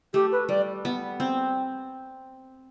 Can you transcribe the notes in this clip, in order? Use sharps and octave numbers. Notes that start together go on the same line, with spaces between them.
A3 G4
B4
G3 D5
B3
C4